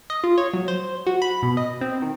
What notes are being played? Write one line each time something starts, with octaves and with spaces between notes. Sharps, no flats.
D#5
F4
C#5
F#3
C5
F#4
B5
B2
D#5
C4
D#3